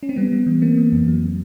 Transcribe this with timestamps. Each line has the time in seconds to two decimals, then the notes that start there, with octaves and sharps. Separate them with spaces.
0.03 C#4
0.09 C4
0.16 G3 B3
0.32 G3
0.46 E3
0.61 E3 A#3 C4
0.78 E3
0.92 F2
1.08 F#3